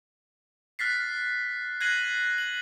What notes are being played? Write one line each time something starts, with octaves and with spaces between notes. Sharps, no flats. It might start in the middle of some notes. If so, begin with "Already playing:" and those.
F6 F#6 A6 B6 C7
F#6 G#6 A#6 C7 D#7 F#7
F#7